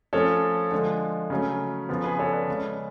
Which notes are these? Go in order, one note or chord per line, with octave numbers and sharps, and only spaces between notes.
F3 A3 C#4 A4 C#5
D3 F3 G#3
C#3 F#3 A3 C#4
C#3 F3 B3
G#4 B4
A4 C#5
B4 D5
C#3 G#3 C#4